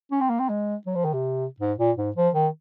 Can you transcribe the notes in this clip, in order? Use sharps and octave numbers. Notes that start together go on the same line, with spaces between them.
C#4
C4
A#3
C4
G#3
F#3
F3
D#3
C3
G#2
A#2
G#2
F3
D#3